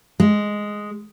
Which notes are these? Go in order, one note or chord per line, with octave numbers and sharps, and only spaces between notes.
G#3